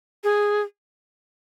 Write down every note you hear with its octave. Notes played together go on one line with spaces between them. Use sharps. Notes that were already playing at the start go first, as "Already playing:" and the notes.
G#4